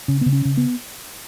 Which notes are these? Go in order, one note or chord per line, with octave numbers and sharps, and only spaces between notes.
C#3 C#4
C#3 B3
C#4
C#3
B3